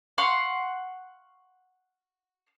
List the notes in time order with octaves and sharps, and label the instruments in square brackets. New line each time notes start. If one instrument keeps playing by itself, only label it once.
[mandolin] F5 F#5 C6 C#6